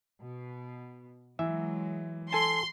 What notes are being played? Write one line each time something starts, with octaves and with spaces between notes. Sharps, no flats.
B2
E3 F#3 G#3 E5
A4 G#5 A5 C6